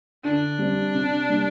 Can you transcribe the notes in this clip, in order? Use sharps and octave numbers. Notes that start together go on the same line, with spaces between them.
D3 D4
G3 C4
C3
G3 A#3